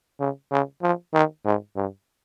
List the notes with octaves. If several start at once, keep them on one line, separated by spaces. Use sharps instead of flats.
C#3
C#3
F3
D#3
G#2
G2